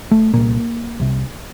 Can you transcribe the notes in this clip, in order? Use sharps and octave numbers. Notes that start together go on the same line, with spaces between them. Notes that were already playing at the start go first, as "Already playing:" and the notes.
A3
C2 A#2 A#3
C2 C3